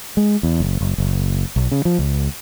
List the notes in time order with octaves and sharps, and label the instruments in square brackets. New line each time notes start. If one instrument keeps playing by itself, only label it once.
[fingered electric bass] G#3
E2
F#1
F#1
F#1
B1
C#3
F3
C#2